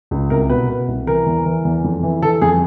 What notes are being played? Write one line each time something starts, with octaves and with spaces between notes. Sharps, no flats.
C#2
C2 A#4
B2 B4
B2
C2
E3 A#4
E2
E3
E2
F2
E3
E3 A4
F2 G#4